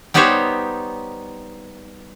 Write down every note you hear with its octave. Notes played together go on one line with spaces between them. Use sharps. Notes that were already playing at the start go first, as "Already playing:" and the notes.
G3 B3 D#4 G4 C5 C#5